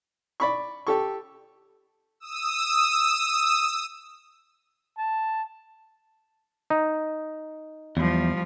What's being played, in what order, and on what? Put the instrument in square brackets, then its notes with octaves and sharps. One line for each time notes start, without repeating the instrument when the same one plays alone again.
[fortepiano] D5 B5 C#6
G4 A4 C#6
[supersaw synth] D#6 E6
[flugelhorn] A5
[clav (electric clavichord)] D#4
[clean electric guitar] E2 [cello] F3 G3